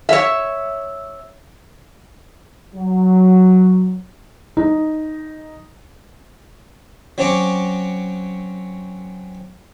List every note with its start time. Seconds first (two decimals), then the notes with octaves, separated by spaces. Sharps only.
0.09 C#5 E5
2.74 F#3
4.57 D#4
7.18 F#3 C4 C#4 C#5 D6